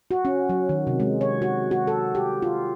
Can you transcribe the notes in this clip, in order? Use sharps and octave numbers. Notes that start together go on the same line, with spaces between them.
F#4
C#4
F#3
D#3
C3
G#3
C#5
F#4
F#4
A4
G4
F4